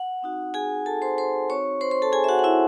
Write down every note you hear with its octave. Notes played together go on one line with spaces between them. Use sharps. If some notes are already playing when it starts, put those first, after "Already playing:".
Already playing: F#5
C4 D#4 F#4
G#4 G#5
A4 A5
C5 C6
C5 C6
C4 D#4 F#4 C#5 C#6
C5 C6
C5 C6
A4 A5
G#4 G#5
E5
F#4 F#5
F#5
E4 E5